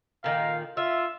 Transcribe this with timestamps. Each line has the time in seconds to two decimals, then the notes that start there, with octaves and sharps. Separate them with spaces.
0.24 A#2 D#3 F5
0.77 F4 E5